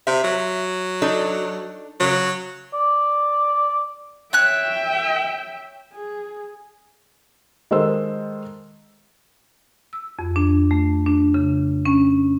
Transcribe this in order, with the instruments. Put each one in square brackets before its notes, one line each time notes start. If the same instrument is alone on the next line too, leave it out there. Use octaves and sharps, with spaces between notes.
[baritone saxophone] C3 [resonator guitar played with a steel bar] E5
[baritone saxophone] F#3
[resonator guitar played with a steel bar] D4 D#4 A4
[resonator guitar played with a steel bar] C#3 [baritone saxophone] F#3
[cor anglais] D5
[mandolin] C#5 F#6 [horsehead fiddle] E5 G5
[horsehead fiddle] G#4
[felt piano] D#3 G#3 A4 C5 E6
[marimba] E6
F2
D4
A3
D4
C#3
C#4